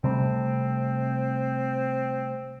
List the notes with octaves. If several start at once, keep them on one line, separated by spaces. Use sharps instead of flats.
C3 G3 A3 C4